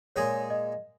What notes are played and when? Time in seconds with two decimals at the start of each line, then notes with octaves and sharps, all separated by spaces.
0.16 A#2 G#3 D#4 G#4 C#5
0.50 D#5